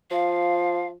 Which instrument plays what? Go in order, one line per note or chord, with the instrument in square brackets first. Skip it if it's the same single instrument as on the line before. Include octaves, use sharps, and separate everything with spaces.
[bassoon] F3 [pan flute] F5